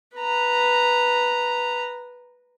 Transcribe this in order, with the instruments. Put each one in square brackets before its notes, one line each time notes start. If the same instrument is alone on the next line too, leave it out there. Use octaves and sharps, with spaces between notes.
[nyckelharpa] B4 A#5